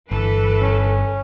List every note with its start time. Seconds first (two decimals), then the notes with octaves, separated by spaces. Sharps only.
0.11 G1 E3 A4 B4
0.61 C#4